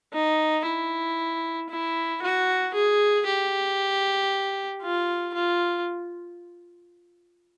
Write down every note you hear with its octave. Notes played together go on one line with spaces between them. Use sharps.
D#4
E4
E4
F#4
G#4
G4
F4
F4